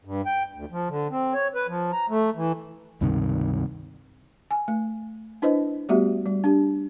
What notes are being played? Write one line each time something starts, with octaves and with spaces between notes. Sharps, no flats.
G2
G5
D2
F3
D3
C4
C#5
B4
F3
A#5
A3
E3
C#2 G2 C3 D#3
G#5
A3
D4 E4 B4 C5 D#5
G3 A3 B3 F#4 G4 E5
G3
D4 G4